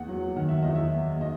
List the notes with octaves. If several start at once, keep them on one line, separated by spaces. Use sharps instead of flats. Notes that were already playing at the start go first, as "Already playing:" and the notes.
Already playing: E2 A#3 F#5
F#3
D#3 F#5
E5
E2 D#5
E5
A#3
D#5